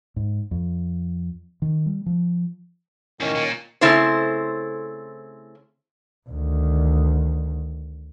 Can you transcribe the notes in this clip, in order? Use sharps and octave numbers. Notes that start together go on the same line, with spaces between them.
G#2
F2
D#3
G3
F3
E2 A2 D#3 C#4
A#2
C#3 A3 C4 E4 A4 C5
D2 D#3